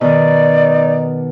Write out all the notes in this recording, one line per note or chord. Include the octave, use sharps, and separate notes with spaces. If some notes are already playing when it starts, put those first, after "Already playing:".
B2 D#3 D#4 D5